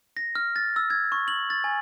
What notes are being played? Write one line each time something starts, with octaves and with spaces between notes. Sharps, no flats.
A#6
F6
A6
E6
G#6
C#6
F#7
A6
G#5